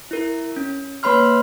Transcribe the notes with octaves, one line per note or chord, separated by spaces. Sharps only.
E4 A#4
C#4
A#3 B4 C#5 B5 C6 F6